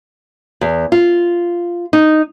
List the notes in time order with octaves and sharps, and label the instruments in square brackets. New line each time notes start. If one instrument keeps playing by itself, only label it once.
[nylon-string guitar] E2
F4
D#4